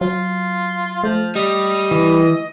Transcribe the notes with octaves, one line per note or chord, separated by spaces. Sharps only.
F#3 F4
F3 A3
G3 D#5
E3